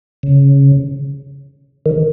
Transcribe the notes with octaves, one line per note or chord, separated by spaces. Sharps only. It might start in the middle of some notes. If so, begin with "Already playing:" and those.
C#3
D#3